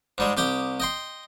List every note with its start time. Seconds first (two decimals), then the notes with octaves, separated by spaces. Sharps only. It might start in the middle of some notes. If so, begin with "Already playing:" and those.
0.18 G#2 G3 G#3
0.37 C2 G4 G5 D#6
0.80 D#5 G5 C6